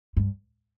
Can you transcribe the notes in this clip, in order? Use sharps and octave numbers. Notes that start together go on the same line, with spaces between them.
G2